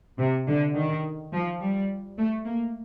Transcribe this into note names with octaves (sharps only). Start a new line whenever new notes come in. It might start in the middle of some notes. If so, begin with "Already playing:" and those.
C3
D3
D#3
F3
G3
A3
A#3